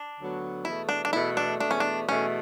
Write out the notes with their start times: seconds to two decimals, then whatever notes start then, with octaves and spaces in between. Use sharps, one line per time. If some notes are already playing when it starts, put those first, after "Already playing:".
Already playing: D4
0.18 D2 D3 F#3 B3
0.65 E2 B2 A3 E4
0.89 D4
1.05 D4
1.13 E2 B2 A3 E4
1.37 D4
1.60 E2 B2 A3 D4
1.71 C#4
1.80 D4
2.08 E2 B2 A3 C#4